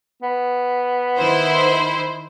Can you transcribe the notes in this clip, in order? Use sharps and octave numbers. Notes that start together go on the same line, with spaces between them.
B3
D#3 E4 C5